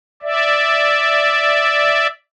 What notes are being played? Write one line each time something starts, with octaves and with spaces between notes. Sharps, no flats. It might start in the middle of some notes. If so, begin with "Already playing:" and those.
D5 E5